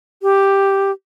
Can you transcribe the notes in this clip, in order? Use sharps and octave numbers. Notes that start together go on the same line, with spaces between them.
G4